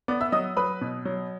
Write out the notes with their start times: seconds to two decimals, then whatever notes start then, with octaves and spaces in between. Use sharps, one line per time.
0.08 B3 D5 D6
0.21 E5 E6
0.32 F#3 D#5 D#6
0.57 F#3 B4 B5
0.81 B2
1.05 F#3